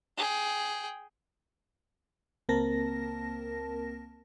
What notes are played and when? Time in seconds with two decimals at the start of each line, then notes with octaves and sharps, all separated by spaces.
0.17 G#4 G5
2.49 C#2 A#3 C4 A#4 A5 A#6